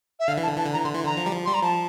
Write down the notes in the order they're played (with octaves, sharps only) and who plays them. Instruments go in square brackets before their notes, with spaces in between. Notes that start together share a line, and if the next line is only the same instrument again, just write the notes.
[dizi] E5
[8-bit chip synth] D3 [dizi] F5
[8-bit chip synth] E3
[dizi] A5
[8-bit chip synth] D3
[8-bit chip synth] E3 [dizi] A5
[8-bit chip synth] D3
[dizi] A#5
[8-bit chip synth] E3
[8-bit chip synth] D3 [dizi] C6
[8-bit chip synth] E3 [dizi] C6
[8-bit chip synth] D3 [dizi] A#5
[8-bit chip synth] F3
G3
F3
[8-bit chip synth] G3 [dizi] C6
[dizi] A#5
[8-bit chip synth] F3 [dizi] A5